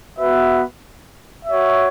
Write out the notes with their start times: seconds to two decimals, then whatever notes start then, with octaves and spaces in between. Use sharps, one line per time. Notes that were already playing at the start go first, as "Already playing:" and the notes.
0.18 B3 F#4 B4 E5
1.46 F#4 C#5 E5